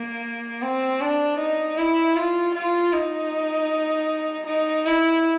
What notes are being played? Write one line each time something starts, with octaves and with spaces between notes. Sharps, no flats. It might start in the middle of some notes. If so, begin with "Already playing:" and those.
Already playing: A#3
C4
D4
D#4
E4
F4
F4
D#4
D#4
E4